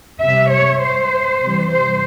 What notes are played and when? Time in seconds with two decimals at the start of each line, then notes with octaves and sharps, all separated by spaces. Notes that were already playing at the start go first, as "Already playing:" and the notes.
0.21 C3 G3 E5
0.51 C#5
0.81 C5
1.40 C3 E3 G3
1.70 C5